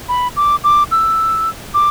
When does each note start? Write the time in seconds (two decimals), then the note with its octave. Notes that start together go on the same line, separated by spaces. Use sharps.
0.09 B5
0.37 D6
0.64 D6
0.91 E6
1.74 D6